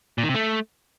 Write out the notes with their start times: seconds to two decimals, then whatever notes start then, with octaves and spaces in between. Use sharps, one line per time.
0.18 A#2
0.23 D#3
0.29 C3
0.35 A3